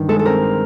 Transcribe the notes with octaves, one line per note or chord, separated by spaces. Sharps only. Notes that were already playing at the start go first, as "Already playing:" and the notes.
Already playing: G2 D#3
G#3 A4
A4
C4 A#4